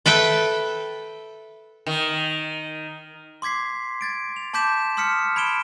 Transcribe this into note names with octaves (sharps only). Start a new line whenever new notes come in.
A4 B4 E5 G5
D#3
C6 D6 G#6 B6 C7
G#6 A6 D7
F7
A5 C6 D6 G6 B6 E7
C6 D#6 F6 B6 C#7
B5 G#6 D7 E7 G7